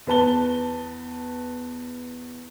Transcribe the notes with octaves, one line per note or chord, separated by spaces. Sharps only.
E2 B4 A5 G7